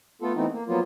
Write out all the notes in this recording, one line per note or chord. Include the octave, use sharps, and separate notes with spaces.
A3 B3 F4 A4
E3 A3 B3 C4 D#4
A#3
F3 F#3 A#3 B3 F4